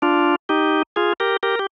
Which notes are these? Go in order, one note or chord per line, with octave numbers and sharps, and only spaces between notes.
D4 F4
D#4 G4
F4 G#4
G4 A#4
G4 A#4
G4